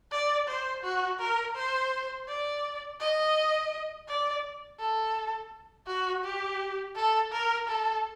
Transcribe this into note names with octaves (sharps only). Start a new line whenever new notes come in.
D5
C5
F#4
A#4
C5
D5
D#5
D5
A4
F#4
G4
A4
A#4
A4